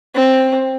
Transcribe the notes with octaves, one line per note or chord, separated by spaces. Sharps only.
C4